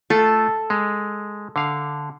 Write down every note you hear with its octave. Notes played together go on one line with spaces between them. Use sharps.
A3 F4 A4
G#3
D3 F5